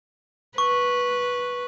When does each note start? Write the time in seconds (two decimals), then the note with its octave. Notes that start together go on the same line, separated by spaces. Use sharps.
0.58 B4 C#6